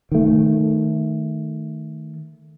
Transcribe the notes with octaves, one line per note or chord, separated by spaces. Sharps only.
D#3 A3